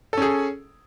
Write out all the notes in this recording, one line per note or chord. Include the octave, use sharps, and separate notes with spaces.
C#4 G#4 A4